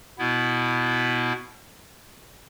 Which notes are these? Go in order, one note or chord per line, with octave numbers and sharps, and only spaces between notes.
B2 B3 E4